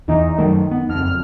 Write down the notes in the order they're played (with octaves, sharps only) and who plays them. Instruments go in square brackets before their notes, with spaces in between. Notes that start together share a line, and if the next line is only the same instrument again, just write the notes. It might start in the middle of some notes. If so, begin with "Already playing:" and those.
[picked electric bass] E2 E3 [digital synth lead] D#4
[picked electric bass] F#2 F#3 A3 [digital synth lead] D#3
[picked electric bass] B3
[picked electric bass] F#1 F2 [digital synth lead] F6